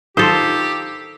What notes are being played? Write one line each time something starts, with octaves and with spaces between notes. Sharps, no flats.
D#3 F4 G4 A4 C5 D#6